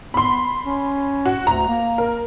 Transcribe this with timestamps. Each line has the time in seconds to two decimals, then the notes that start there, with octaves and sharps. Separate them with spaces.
0.14 B3 B5 C6
0.66 C#4
1.26 F#4
1.47 D2 A#5
1.68 A#3
1.98 A#4